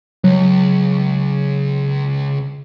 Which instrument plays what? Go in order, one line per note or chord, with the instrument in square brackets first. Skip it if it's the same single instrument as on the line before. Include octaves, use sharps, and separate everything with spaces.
[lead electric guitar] C#2 [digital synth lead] F#3